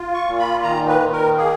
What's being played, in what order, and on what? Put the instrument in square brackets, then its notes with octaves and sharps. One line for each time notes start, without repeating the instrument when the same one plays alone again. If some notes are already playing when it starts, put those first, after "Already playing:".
Already playing: [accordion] F4
C#6
A#2
B5
D#3 A#5
B4
D#3
A#4
A#3 G#4